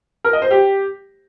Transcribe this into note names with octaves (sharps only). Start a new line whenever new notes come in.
A#4
D#5
C5
G4